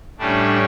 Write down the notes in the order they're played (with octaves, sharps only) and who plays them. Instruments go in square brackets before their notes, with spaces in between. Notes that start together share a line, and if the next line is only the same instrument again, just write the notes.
[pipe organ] A2 G3 C#4 D4